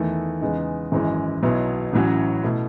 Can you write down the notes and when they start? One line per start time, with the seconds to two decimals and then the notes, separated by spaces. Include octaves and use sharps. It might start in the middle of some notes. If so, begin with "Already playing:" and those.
Already playing: E2 D#3 A3 E4
0.41 E2 C#3 G#3 B3 D#4
0.92 G#1 F#2 E3 G#3
1.43 B1 B2 F#3 B3 E4
1.93 A1 A2 F#3 C#4 F#4
2.43 B2 A3 E4